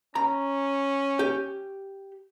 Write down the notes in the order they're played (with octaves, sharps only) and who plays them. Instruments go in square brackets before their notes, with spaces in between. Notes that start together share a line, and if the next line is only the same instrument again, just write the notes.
[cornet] C#4 [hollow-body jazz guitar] A#5
[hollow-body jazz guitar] G4